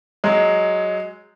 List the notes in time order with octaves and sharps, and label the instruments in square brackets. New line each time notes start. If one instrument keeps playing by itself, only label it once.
[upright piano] F#3 G#3